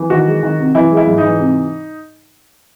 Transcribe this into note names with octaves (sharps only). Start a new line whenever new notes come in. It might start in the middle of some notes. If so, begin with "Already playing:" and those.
Already playing: E3
D#3 F#4
G#3
D#3
C3
E3 E4
G#3
E4
G#2
D#4
E3
C3